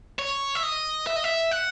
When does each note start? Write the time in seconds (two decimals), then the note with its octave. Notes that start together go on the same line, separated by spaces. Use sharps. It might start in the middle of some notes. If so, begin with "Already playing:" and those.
0.19 C#5
0.55 E5
0.63 D#5
1.07 E5
1.16 D#5
1.24 E5
1.51 F#5